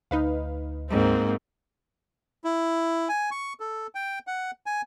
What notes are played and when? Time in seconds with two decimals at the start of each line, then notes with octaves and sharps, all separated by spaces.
0.11 D2 D#4 B4 F5
0.90 G#2 A#3 C4
2.44 E4
3.09 G#5
3.31 C#6
3.60 A4
3.95 G5
4.27 F#5
4.66 G#5